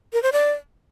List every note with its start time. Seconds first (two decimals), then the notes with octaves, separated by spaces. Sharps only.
0.13 A#4
0.23 C5
0.33 D5